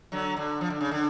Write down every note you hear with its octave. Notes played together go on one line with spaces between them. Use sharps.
D3 F#3
D3
F3
D3
C#3
D3